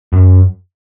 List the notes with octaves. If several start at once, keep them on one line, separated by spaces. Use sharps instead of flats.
F#2